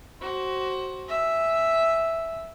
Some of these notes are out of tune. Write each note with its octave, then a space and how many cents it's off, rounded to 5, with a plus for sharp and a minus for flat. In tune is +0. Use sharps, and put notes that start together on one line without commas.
F#4 +25 C5 +20
E5 +0 G#5 +0